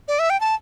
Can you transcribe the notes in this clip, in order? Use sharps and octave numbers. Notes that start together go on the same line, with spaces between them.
D5
E5
G5
A5